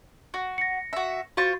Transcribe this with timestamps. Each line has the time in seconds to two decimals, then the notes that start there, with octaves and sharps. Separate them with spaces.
0.34 F#4
0.58 A#6 C#7
0.93 F#4 E5
1.37 F4 F#4 C5 C#6 A6